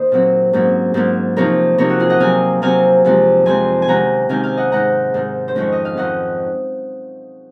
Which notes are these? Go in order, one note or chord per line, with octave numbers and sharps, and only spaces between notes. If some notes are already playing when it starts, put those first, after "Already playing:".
Already playing: D#3 A#3 C5 D#5
A#2 F#3 C4
G#2 F#3 A#3 C#4
G#2 F#3 A#3 C#4
C3 F3 A#3 D#4 A#4 C#5
C3 F3 A#3 D#4 A#4 C#5
F#4
F4 G#4
D#5 F#5
C3 F#3 C4 F5 G#5
C3 F#3 C4 F5 G#5
F2 C3 F3 G#3
F2 C3 F3 G#3 G#5 C6
G#5
C3 D#3 G#3 C#4 F#5 A#5
C3 D#3 G#3 C#4 F5 G#5
F5 G#5
D#5 F#5
G#2 D#3 G#3 F#5 A#5
G#2 D#3 G#3
C5
F2 D#3 G#3 C#4 C#5
D#5
F5
F2 D#3 G#3 C#4 D#5 F#5